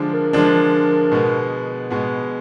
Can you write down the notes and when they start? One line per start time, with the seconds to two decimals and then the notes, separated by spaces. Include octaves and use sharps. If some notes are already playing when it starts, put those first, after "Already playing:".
Already playing: D3 F3 G#3 D4
0.13 A#4
0.33 D3 F3 G#3 D4
1.12 B2 G#3 B3
1.91 B2 G#3 B3